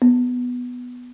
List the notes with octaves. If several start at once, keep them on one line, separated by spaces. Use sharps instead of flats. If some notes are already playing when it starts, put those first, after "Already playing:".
B3